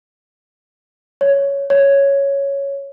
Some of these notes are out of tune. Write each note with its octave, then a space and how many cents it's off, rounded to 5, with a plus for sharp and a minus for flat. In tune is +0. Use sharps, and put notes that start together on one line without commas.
C#5 +5
C#5 +0